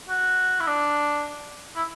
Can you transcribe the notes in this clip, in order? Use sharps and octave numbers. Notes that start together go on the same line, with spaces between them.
F#4
E4
D4
E4